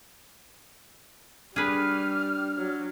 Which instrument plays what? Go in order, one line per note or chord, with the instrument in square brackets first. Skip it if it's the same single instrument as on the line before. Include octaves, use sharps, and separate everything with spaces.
[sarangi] G3 [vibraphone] D4 [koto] G#4 B4 [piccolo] F6
[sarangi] F#3